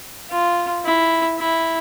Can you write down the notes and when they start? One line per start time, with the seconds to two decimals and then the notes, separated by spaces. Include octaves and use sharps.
0.30 F4
0.85 E4
1.39 E4